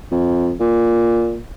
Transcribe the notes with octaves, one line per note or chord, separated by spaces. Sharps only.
F2
A#2